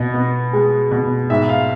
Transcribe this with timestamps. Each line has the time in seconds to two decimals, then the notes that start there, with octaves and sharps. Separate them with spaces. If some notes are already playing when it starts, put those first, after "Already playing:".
Already playing: B2 D#5
0.14 B3
0.53 G#3
0.91 B2
1.30 G#2 E5
1.49 F5